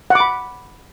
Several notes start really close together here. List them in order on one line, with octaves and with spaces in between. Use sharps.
F#5 D6 B5